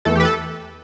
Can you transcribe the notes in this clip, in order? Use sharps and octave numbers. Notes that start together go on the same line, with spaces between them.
E2 E3 A3 A4
G4
B4
A4